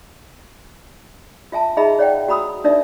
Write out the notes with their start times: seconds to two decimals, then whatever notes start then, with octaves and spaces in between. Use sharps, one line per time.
1.52 F4 E5 G#5 A5
1.77 D#4 G#4 D#5 E5 A#5 B5
1.99 C#5 D5 F#5 G5
2.28 F#4 A#5 B5 D#6 E6
2.64 D4 D#4 A#4 D5 E5